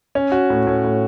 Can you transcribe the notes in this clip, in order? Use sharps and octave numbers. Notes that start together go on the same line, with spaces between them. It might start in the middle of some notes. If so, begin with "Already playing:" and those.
C#4
F#4
A2
A2
A2